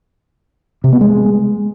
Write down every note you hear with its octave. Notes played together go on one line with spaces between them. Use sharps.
C3
B3
G#3